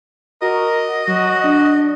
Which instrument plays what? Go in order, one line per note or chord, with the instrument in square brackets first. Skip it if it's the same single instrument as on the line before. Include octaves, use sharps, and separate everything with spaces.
[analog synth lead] F#4 [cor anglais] A#4 [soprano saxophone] D#5
[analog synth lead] F#3 [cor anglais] F#4
[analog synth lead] D4
D4